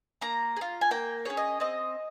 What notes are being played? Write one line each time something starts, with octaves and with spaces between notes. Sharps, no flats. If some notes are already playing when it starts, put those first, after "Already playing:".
A#3 A#5
G#4
F4
G#5
A#3 G5
C#4 G#4 C#5
D#5
C4 D#5